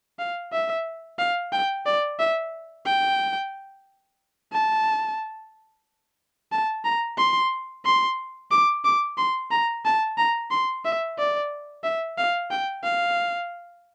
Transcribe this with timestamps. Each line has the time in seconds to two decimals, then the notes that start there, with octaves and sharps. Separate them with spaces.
0.19 F5
0.52 E5
1.18 F5
1.52 G5
1.86 D5
2.19 E5
2.86 G5
4.53 A5
6.52 A5
6.84 A#5
7.18 C6
7.85 C6
8.51 D6
8.85 D6
9.18 C6
9.51 A#5
9.85 A5
10.17 A#5
10.51 C6
10.85 E5
11.18 D5
11.84 E5
12.18 F5
12.51 G5
12.84 F5